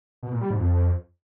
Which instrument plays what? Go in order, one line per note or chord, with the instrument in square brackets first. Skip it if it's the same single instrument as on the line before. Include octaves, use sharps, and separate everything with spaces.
[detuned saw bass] B2
A#2
G3
G#2
F2